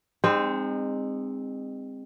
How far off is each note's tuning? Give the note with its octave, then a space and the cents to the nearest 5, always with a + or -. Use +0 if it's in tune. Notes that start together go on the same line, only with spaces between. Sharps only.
G#3 -35 C4 +0 D#4 -30